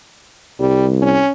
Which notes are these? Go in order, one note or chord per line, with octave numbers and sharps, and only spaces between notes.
C2 G3
C#4